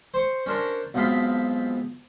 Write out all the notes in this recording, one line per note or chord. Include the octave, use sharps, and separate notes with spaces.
C5 C#6
C#4 D4 A#4 C5 C#5
B1 F2 F3 G#3 F5 B5